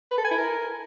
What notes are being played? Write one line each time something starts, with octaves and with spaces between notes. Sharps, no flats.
B4
A4
G#5
E4
A#4